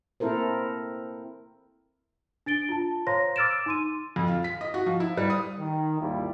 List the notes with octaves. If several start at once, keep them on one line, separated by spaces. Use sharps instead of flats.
A#3 C4 E4 A4 A#4 C5
D4 A6 D7 G7
F4 A5
C5 C#5 F5 A#5 C6 A#6
D6 E6 F6 A6 D7 E7
D#4 C6 D#7
F2
F4
B6
D#5
F#4
F3
E4
G3
D#6
D#3
G#1 D#2 G3 E4 F4